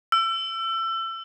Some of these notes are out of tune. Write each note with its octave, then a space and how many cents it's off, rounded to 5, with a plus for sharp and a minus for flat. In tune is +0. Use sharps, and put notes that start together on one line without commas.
E6 +25